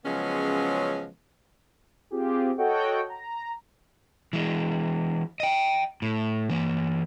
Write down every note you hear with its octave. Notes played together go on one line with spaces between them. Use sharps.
C#3 F3 F#3 G#3 B3 C#4
C4 F4 G4 G#4
F#4 A4 C#5 D#5 F#5 G5
A#5
E3 G#3
D#5 G5
A2
E3 A#3